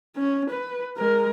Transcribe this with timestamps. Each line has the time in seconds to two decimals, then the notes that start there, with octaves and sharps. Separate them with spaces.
0.16 C#4
0.50 B4
0.97 G#3 A#4